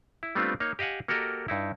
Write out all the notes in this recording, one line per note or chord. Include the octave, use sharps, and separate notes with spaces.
E4
G3 A3 B3 C4 D4 F4
A#3 D#4 C#5
G4 D#5 F5 F#5 G#5
A#3 F#4 G4 A4 A#4 D#5
G2 D#4 E4